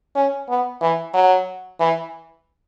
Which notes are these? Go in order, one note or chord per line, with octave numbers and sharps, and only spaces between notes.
C#4
B3
E3
F#3
E3